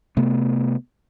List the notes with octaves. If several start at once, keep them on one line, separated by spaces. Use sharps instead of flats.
C3 A3 B3